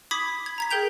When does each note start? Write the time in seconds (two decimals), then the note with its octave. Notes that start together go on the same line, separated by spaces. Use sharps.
0.11 B5 D6 D#6 G#6 B6
0.46 G#6
0.58 A#5 G#6 B6
0.71 G#4 A#4 G5 G6 F7